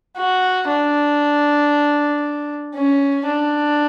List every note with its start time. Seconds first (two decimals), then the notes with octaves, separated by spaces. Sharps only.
0.17 F#4
0.69 D4
2.75 C#4
3.26 D4